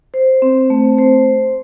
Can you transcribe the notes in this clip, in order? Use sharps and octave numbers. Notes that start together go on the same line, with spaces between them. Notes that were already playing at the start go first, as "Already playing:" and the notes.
C5
C4
A3
C5